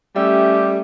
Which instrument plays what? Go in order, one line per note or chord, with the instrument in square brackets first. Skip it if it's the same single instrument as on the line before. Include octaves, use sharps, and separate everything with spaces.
[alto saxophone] G3 [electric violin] A3 C#4 [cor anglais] G4 [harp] E5